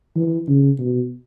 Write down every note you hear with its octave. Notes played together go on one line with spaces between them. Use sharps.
E3
C#3
B2